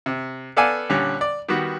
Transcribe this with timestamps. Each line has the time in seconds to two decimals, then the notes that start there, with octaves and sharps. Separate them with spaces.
0.06 C3
0.57 B3 A4 D5 F5 G#5
0.90 A#2 D3 G3 C#4
1.21 D5
1.49 D#3 G3 B3 F#4